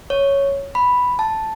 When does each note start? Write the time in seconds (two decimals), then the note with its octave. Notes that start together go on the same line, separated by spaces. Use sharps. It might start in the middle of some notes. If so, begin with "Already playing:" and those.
0.10 C#5
0.75 B5
1.19 A5